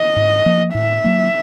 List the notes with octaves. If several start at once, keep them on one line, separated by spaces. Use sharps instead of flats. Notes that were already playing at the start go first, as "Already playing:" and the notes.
Already playing: D#5
G#2
F3 A#3
A2 E5
F#3 A#3